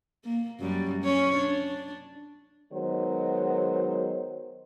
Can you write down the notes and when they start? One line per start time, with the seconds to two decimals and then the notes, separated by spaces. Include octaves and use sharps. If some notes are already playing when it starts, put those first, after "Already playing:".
0.25 A#3
0.60 F#2 G3
1.03 C#4 C#5
1.37 D4
2.73 D#3 F#3 G#3 B3 C5